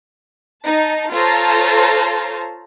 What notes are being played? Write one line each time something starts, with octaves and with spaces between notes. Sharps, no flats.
D#4 A5
F4 A4 C5 C#5 A5 A#5